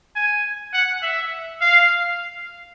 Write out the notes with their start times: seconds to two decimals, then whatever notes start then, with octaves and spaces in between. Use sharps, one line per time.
0.16 G#5
0.73 F#5
1.02 E5
1.61 F5